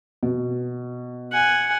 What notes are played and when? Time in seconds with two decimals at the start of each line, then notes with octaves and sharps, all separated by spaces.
0.23 B2
1.32 F#5 G#5